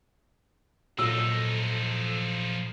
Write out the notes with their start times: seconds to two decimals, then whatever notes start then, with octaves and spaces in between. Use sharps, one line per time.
0.99 A#2 F3 F#3 D#4 A4 E6